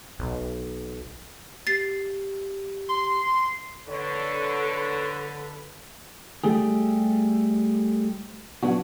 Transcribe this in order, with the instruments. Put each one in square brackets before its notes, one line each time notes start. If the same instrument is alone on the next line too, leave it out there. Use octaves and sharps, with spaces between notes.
[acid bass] B1
[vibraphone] G4 [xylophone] A6 C7
[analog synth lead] C6
[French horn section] D3 [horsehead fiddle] A4 B4 [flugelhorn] C#5
[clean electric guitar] G3 A3 G4 G#4
F#3 B3 D4 F#4